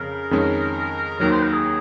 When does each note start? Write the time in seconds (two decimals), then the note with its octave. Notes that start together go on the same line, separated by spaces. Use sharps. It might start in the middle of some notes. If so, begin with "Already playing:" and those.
Already playing: F2 C#3 A#4
0.31 F2 D#3 G#3 C#4
1.19 D#2 D#3 F#3 A#4
1.31 C5
1.43 A#4
1.53 G#4